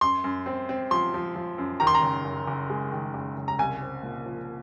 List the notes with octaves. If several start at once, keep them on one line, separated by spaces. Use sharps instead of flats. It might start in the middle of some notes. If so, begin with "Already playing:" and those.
F#2 C6
F#2
C4
C4
F3 C6
F3
F3
F#2
D#3 A#5
C6
A#5
F#1
F#1
F#1
G#3
D#3
F#1
F#1
A#5
C2 G#5
C4
A#2
F3